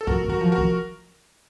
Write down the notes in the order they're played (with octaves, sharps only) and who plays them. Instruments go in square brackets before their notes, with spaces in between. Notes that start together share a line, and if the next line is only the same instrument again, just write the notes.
[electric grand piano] A4
[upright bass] F3 [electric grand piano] F#4 A#4
[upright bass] F#3
[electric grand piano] F#4 A#4
[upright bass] F3
[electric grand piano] F#4 A#4
[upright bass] F3